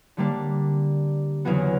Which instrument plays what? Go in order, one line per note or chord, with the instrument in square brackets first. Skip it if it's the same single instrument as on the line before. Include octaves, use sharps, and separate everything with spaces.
[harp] D3 G3 A#3 D4
E2 C#3 F#3 B3 F#4